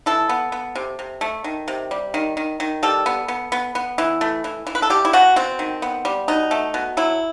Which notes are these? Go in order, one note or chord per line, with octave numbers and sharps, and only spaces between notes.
E3 A4
B3
B3
C3
C3
A3
D#3
C3
G3
D#3
D#3
D#3
G3 A4
B3
B3
B3
B3
E3
A3
E3
E3
B4
A4
G3 G4
E4
B2 F#4
B2 C4
D#3
B3
G3
B2 D#4
A3
B2
F#3 E4